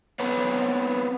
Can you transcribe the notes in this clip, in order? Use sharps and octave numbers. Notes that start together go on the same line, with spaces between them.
B3 C4 B4 C#5